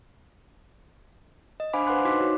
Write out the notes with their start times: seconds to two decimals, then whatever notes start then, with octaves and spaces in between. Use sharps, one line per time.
1.60 D#5
1.73 D4 C5 F5 G#5 B5 D6
1.87 B4 C5 F#5 B5 C6 F#6
2.05 D#4 F#4 C6 D6 B6
2.20 F#4 C#5